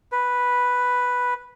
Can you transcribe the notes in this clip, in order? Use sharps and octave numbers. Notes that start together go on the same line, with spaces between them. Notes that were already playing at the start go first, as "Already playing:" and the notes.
B4